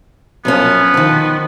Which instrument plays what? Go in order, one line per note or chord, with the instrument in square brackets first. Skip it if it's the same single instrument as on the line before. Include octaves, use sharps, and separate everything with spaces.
[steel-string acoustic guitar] F#2 F3 C#4 [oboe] B3
[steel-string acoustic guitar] D#3 F3